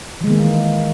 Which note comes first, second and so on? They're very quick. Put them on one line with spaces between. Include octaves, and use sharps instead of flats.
E3 G#3 D#3 A#3